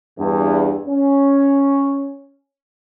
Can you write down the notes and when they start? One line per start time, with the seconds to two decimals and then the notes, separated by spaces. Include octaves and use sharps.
0.19 E2 G2
0.88 C#4